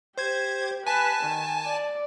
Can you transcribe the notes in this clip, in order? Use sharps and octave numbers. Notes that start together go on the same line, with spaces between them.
G4 C5 G#6
B4 G#5 A5
D#3
D5